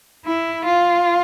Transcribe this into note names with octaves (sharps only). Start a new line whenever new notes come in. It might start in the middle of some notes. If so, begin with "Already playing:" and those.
E4
F4